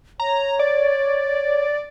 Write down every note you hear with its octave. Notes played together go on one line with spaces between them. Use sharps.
C#5 A#5
D5